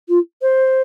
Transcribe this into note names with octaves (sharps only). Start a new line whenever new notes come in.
F4
C5